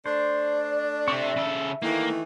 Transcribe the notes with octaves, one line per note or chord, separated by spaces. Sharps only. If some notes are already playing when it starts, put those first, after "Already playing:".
A3 D4 C5 D5
C3 C4 E5 C#6
C#3 A4
D#3 E3 A3 A#3 E4